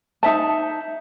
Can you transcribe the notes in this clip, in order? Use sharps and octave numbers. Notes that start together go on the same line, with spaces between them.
D#4 E5 A5